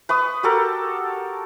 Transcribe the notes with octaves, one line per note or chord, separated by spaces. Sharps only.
B4 C#6 D#6
F#4 G4 A4 A#4